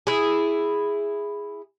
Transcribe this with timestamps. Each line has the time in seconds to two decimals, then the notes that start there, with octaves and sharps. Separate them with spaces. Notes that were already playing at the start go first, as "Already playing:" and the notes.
0.07 E4 G#4